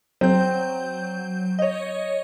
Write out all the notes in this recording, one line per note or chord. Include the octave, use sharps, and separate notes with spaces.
F#3 C4 G6
C#5 D#5